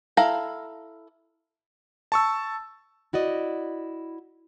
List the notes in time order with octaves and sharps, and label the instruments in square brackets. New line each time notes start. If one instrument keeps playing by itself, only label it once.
[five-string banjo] E4 A4 F5 A#5
[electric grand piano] A5 C#6 E6
[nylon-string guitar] E4 F#4 D5 D#5